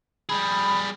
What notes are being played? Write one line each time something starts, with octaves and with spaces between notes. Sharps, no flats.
G3 G#4 B5